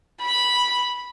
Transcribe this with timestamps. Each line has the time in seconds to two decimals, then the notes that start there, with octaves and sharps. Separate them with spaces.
0.21 B5